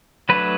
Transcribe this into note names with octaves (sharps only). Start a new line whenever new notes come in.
F#3 A3 D4 B4